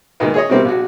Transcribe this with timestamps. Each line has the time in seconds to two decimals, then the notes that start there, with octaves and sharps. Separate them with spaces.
0.20 A#2 D#3 G#3 A#3 B3
0.34 G#4 C#5 D#5
0.50 C3 G3 A#3 C4
0.65 A#1 F#4